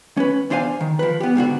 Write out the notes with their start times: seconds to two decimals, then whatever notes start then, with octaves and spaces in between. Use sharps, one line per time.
0.17 C#4 B4
0.50 E2 D4 C5 F5 G#5
0.81 D#3
0.99 F3 B4
1.20 B3 G4
1.35 G#2 B2 D3 F#4